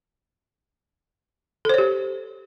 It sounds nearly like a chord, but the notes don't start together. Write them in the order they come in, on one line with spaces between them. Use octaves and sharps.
A4 C5 C#5 G4